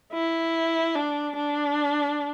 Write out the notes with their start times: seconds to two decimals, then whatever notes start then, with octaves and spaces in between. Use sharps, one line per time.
0.13 E4
0.95 D4
1.36 D4